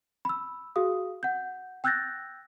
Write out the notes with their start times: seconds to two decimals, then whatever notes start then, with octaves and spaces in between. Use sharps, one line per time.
0.25 B5 E6
0.76 F#4 G#4 F5 D#6
1.23 F#5 G6
1.84 G5 E6 F#6 G6 A6 A#6